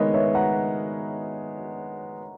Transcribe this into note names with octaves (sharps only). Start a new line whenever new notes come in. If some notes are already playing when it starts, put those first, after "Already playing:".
Already playing: D#3 G#3 B3 A#4 B4 C#5 D#5
C#5 E5
F#5 A#5